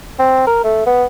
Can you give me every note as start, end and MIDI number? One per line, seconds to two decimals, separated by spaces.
0.19 0.45 60
0.47 0.59 70
0.64 0.86 57
0.86 1.05 59